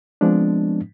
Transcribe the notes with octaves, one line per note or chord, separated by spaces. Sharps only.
F3 G#3 B3 C4 D4